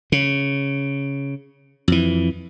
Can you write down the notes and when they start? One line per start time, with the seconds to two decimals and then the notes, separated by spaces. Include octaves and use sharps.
0.12 C#3
1.88 F2 E3